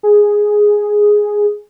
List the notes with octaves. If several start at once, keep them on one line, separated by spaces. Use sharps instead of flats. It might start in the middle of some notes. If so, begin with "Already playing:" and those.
G#4